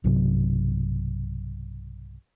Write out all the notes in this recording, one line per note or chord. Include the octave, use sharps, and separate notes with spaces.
B1 G2 C3 F#3